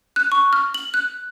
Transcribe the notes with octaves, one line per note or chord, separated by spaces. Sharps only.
F#6
C#6
F6
F#7
F#6